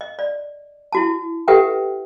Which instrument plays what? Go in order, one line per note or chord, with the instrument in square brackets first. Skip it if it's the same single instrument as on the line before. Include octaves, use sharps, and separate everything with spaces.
[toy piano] D#5
D5
E4 F#4 A5
G4 A4 B4 E5 F#5 G5